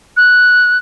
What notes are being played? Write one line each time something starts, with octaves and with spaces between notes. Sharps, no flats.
F#6